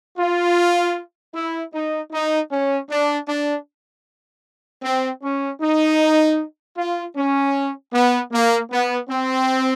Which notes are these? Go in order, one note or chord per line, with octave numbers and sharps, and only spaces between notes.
F4
E4
D#4
D#4
C#4
D4
D4
C4
C#4
D#4
F4
C#4
B3
A#3
B3
C4